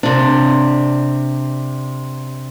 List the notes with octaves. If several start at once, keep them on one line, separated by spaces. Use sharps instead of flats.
C3 D4